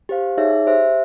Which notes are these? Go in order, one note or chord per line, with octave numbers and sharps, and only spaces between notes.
G4 C5 F5
D#4 G#4 C#5 E5
G4 C5 E5